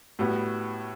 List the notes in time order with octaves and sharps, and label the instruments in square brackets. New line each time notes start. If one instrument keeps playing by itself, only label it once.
[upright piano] A2 G3 B3 F#4